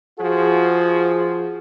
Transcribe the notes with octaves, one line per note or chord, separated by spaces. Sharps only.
F3 F#4 G#4